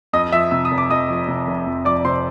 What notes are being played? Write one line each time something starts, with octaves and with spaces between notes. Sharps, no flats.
F2 D#5 D#6
F3 E5 E6
C3 E6
D#6
F1
D6
F2 D#5 D#6
F3
C3
F1
F2
F3 D5 D6
C3 C5 C6